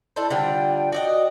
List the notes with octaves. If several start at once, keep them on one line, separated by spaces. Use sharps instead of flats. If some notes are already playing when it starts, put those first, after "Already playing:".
D4 E4 A4 C5
D3 F3 G3 G5
F#4 D5 D#5